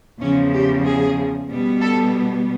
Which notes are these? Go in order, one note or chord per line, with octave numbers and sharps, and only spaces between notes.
E2 C#3 F3 C#4
G4
G#4
B2 G3 B3
A4